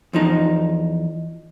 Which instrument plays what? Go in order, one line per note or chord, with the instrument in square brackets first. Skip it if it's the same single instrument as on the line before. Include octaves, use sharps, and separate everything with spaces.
[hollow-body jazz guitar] E2 F3 D#4